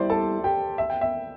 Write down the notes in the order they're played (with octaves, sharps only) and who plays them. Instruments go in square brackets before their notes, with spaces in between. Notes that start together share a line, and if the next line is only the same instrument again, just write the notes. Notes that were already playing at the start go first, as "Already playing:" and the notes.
Already playing: [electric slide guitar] G3 E4 G4 [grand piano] C5 D5 C6
[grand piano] A4 A5
G4 G5
E5
G5
E5